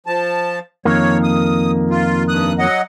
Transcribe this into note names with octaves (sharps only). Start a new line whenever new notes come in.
F3 A5
F2 D#3 A#3 C#5
D#6
F4
G2 D#6 F#6
F#3 D#5 F#5